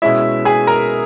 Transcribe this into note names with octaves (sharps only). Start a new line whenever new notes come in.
B2 G#3 C#4 E4 E5
G#4 G#5
A#4 A#5